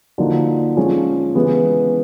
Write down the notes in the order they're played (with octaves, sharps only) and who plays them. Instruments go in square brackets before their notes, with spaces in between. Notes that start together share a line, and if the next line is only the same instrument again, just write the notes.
[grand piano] D3 F3 A#3 D#4 F#4
F3 G#3 C#4
C#3 E3 G#3 B3 E4